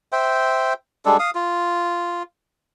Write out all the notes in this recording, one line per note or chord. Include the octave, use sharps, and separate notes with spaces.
C5 E5 G5
G3 G#3 D4 A4
F5 D#6
F4